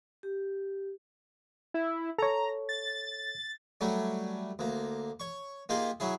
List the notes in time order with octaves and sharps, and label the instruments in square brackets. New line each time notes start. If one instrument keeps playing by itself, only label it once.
[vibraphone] G4
[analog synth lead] E4
[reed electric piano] A4 C#5 [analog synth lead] A#5
[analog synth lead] A6
[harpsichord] F#3 G3 A3 C#4
D2 A#3
C#5 C#6
A#3 D#4 F4 G4 G#4
F#3 C#4 E4 G#4